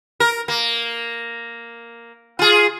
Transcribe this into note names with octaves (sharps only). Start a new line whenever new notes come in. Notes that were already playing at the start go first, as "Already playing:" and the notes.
A#4
A#3
F4 G#4